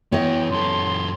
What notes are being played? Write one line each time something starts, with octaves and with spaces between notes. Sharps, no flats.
E3 B3 C#5 D#5 G5
F#2 A4 C6